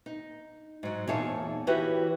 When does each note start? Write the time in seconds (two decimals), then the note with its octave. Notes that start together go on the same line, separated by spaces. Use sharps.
0.06 D#4
0.83 G#2 F#3
1.07 E2 A#2 D#4 G#4 C#5 A5
1.67 E3 E4 F#4 G4 B4 C#5